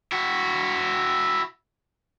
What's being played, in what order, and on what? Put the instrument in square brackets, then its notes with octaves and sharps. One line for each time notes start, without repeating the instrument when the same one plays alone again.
[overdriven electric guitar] E4 F#4